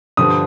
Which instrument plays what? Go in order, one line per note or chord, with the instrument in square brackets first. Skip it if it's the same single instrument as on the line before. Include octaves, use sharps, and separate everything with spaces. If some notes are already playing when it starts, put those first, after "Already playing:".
[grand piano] G2 D3 F3 D#6